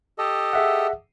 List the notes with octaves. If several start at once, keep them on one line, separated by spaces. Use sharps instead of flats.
G4 A4 D#5
G#4 E5 F#5